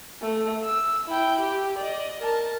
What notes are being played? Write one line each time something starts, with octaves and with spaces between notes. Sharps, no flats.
A3
E6
E4 G5
G4
D5 D#5
A#4 A5